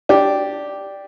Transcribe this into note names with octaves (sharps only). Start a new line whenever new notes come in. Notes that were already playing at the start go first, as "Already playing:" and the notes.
D4 G4